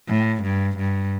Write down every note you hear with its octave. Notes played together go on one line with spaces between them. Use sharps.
A2
G2
G2